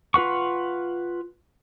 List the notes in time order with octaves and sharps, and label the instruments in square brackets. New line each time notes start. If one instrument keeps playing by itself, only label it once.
[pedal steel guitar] F4 B4 F#5 C#6